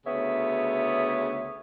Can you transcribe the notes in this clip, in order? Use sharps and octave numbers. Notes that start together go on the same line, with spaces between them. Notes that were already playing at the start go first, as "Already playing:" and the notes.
D2 C#3 B3 C#5 E5